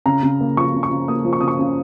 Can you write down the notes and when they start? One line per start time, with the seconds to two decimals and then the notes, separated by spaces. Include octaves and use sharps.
0.06 C#3 A#5
0.23 C#3
0.41 A#3
0.57 F3 C#6
0.74 C#3
0.83 C#6
0.91 C#3
1.08 A#3 D#6
1.25 F3
1.33 C#6
1.40 C#3 D#6
1.48 C#6
1.59 C#3